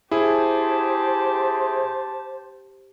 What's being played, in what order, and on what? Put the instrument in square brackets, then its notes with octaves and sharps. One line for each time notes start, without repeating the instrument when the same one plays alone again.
[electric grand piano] E4 G#4 [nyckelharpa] G4 A5 [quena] C5